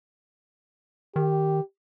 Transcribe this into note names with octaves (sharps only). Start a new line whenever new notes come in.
D#3 G4